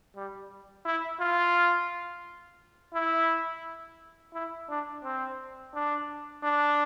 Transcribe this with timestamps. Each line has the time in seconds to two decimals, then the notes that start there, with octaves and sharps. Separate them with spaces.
0.16 G3
0.86 E4
1.20 F4
2.94 E4
4.34 E4
4.69 D4
5.04 C4
5.74 D4
6.43 D4